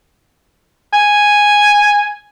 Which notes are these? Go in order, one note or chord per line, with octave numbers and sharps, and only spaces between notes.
G#5